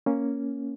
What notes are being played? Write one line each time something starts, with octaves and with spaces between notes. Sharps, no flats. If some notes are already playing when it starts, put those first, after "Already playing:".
A#3 C#4